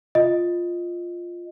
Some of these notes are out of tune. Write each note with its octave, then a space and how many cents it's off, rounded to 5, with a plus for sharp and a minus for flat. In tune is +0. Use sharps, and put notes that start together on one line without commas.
F4 +0 D#5 +0